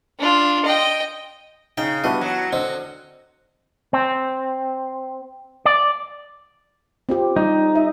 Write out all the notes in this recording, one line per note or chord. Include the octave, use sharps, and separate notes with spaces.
D4 F4
D#5 G5
C#3 D#4 G5
G3 B3 D4 E4 F#4 D#5
F#3 F#5
D3 C4 D#5
C4
D5
C4 F4 G4
G3 D#4
E5